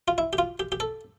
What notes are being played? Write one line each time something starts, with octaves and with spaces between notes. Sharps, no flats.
F4
E4
G4
F4
G4
G4
A4